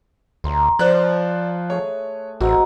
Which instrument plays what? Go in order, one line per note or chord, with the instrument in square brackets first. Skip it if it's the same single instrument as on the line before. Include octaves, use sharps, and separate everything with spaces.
[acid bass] D2 [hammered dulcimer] A#5 C6
[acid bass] F3 [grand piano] C5 D5 F#6
[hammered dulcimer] A3 G#4 [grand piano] C#5
[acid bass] A1 [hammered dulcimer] G#2 C4 A#4 [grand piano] F#4